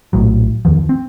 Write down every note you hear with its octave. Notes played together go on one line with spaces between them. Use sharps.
A#1 A2 F#3
E2 D#3 F3
C4